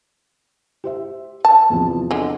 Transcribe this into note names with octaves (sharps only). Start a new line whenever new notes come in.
G4 C5 E5
A5
E2 C3 F3
D3 G#3